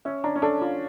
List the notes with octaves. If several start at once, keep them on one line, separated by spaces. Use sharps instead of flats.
C#4 E5
D4 A#5
C#4
D4 A4
F4